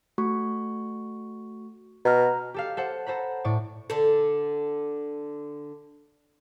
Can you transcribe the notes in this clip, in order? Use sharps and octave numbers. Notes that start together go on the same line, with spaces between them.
A3 F#4 C#6
B2 A#5 F6
G4 A4 F5
A4 C5 F#5
A4 C5 A#5 B5
A2 D5 C#6
D3 A4